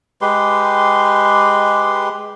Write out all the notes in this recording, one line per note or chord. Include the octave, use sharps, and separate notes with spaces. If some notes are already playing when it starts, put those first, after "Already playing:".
G#3 G4 B4 C6